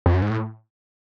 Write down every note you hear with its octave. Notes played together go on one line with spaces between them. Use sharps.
F2
F#2
G#2
A2